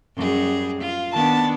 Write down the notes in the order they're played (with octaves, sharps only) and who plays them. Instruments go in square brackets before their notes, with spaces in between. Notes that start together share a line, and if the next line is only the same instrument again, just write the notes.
[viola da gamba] F#2 G3 G#4
F4
[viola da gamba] D#3 B3 D4 [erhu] A5